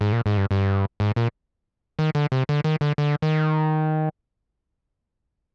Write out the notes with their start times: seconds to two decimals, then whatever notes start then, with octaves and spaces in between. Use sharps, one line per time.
0.01 G#2
0.12 A#2
0.26 G#2
0.37 G2
0.51 G2
1.00 G#2
1.16 A#2
1.99 D#3
2.15 D3
2.32 C3
2.49 D3
2.64 D#3
2.81 D3
2.98 D3
3.22 D#3